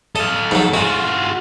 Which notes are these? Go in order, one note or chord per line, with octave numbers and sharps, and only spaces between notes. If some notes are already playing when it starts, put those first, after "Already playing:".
A4 D#5 F5
G#2 F#3
G#3 F4 F#4